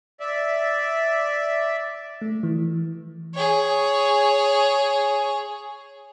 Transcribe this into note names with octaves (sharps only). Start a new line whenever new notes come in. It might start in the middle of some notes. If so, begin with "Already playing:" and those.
D5 E5
A3
E3
G#4 C#5